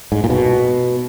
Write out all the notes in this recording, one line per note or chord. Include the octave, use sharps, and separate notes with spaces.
G#2
A#2
B2